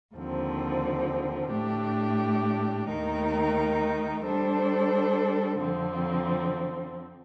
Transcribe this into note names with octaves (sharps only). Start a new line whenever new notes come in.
D#2 D3 F3 C4
A2 A3 D4 G4
D#2 D#3 A3 D#4 A#4
G3 D4 A4 C5
F2 D3 F3 C4